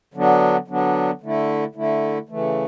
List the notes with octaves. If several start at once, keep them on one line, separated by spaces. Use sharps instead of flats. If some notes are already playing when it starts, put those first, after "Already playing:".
D3 F#3 B3 D4
D3 F#3 B3 D4
D3 A3 E4
D3 A3 E4
C#3 E3 A3